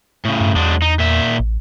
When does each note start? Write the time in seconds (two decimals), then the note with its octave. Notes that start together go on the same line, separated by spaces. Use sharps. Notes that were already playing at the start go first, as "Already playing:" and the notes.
0.25 A2 C#3
0.41 G2
0.56 E2 F#3 G#3 D4
0.82 D#4
0.99 A#2 E5
1.40 A1